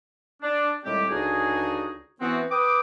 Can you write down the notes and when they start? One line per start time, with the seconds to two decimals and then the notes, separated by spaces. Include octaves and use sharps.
0.42 D4
0.84 A2 D#3 G3 G#3 C4 G4
1.09 C#2 D3 D4 D#4 F#4 G#4
2.21 E3 B3 C4 F#4
2.51 B4 G5 D6 D#6